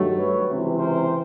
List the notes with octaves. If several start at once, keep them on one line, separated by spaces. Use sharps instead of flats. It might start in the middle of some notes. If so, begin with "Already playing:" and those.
Already playing: G2 D#3 F#3 A3
B4 C#5
C#2 C3 E3
A#4 C5